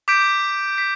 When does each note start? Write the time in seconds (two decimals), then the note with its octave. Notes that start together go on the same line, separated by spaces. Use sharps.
0.08 D6 G6 B6 D7
0.78 B6